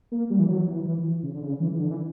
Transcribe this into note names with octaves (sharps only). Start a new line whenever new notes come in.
A#3
G3
E3
F#3
E3
E3
C#3
D3
C#3
E3
E3
D3
E3